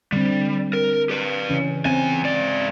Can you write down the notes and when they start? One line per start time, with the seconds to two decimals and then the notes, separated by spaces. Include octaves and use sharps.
0.12 D3 G3 C4
0.73 A#4
1.09 G4 B4
1.50 C#3 E3 C#4
1.86 E2 C4 G#5
2.24 G#2 D5